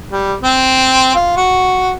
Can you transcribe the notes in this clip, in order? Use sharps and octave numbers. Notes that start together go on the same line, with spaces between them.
G3
C4
F4
F#4